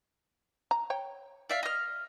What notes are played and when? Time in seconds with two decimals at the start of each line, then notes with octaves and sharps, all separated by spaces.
0.71 A#5
0.90 C#5 G5
1.49 D5 E5 F5
1.63 D#5 F6